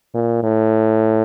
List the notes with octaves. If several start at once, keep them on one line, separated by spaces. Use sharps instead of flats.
A#2
A2